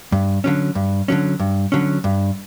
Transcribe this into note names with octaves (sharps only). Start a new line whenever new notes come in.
G2
D3 F#3 C#4
G2
D3 F#3 C#4
G2
D3 F#3 C#4
G2